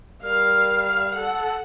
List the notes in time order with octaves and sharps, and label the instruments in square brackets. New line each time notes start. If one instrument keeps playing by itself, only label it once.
[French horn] G3 [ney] A#4 [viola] F5 [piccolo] F6
[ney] A4 [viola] F#5